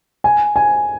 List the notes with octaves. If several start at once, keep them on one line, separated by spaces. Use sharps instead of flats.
G#5
G#5